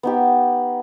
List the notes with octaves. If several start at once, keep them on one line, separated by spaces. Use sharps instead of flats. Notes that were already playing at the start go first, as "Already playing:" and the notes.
B3 D#4 G4